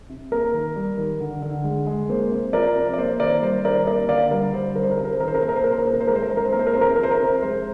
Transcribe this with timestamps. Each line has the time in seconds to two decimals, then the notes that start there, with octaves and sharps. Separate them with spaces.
0.09 C3
0.32 A#3 A#4
0.54 D#3
0.76 G3
0.98 D#3
1.20 D3
1.42 D3
1.64 G#3
1.87 G#3
2.09 A#3 C5
2.31 C3
2.53 F3 A#4 D5
2.75 C3
2.94 D5
2.98 A#3 C5
3.20 D#3 A#4 D5
3.42 G3 C5
3.65 D#3 A#4 D5
3.87 A#3 A#4 D5
4.09 D3 D5 F5
4.31 G3 A#4
4.54 D3 C5
4.75 G3 A#4
4.83 C5
4.91 A#4
4.98 C3 C5
5.05 A#4
5.12 C5
5.20 D#3 A#4
5.28 C5
5.34 A#4
5.42 A#3 C5
5.49 A#4
5.56 C5
5.64 A#2 A#4
5.71 C5
5.78 A#4
5.86 A#2 C5
5.93 A#4
6.01 C5
6.07 G#3 A#4
6.16 C5
6.23 A#4
6.30 G#3 C5
6.37 A#4
6.44 C5
6.52 A#3 A#4
6.59 C5
6.67 A#4
6.74 C3 C5
6.81 A#4
6.88 C5
6.96 F3 A#4
7.03 C5
7.11 A#4
7.20 C3
7.42 G#3 C5